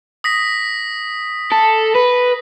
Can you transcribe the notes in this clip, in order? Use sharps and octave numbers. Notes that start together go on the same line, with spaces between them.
D#6 A#6 B6
A4
B4